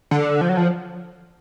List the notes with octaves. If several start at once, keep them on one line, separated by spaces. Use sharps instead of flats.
D3
F3
F#3
F3